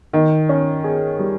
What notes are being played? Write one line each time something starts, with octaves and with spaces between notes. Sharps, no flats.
D#3
C#4
G#4
G3